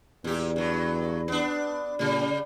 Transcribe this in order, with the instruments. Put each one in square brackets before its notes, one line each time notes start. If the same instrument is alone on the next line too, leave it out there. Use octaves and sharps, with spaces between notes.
[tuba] E2 [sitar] A#2 G4
[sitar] G2 F#3
B3 D4
[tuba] A#2 [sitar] C#3 G3